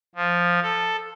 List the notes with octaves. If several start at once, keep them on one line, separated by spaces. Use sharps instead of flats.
F3
A4